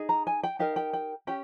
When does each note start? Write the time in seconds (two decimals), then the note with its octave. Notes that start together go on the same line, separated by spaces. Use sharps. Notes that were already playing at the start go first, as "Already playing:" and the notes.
Already playing: D#4 G#4
0.09 A#5
0.27 G#5
0.43 G5
0.59 D#4 G4 A#4 F5
0.76 G5
0.93 G5
1.27 C#4 G4 G5